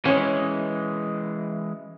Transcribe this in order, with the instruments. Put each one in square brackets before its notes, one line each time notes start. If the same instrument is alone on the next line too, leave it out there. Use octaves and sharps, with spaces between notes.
[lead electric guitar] E3 G#3 [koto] C#4 C#5